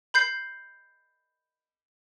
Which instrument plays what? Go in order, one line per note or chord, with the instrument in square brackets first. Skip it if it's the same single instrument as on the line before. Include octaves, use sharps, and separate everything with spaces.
[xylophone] B5 G6 C7